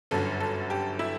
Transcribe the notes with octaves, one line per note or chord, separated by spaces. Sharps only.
G1 F#2 D3 A4
A4
G4
E4